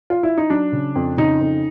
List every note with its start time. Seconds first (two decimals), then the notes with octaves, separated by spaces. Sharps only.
0.10 F4
0.23 E4
0.38 D#4
0.50 F#3 D4
0.72 C#3
0.95 F2
1.17 C#3 D#4
1.41 F2